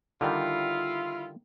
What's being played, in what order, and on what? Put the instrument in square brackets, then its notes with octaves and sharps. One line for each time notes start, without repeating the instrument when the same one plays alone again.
[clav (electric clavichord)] D3 D#3 G3 [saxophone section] E4 F4